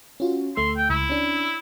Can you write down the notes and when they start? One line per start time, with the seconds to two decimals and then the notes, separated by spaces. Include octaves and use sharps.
0.20 C#4 F4 F#4
0.57 D2 A3 C6 E6
0.77 G5
0.90 C#2 E4
1.10 C#4 D4